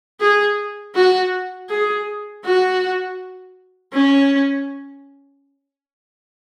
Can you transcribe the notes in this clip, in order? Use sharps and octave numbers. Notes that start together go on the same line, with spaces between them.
G#4
F#4
G#4
F#4
C#4